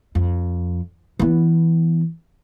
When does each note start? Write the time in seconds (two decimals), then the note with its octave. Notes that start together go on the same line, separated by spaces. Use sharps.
0.15 F2
1.19 E3 B3